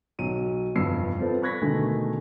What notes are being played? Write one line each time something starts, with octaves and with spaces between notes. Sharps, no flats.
B1 F#3 D#7
F1 E2 G2 E6 C7
C4 F4 A4 B4
B5 C#6 F#6 G#6 A#6 B6
B2 D3 D#3 G#3 A3 B3